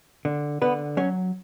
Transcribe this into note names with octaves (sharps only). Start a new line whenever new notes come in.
D3
D3 B3 B4
F#3 C#4 C#5